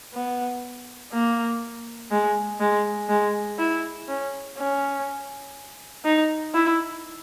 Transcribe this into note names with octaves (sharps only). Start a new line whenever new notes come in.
B3
A#3
G#3
G#3
G#3
E4
C#4
C#4
D#4
E4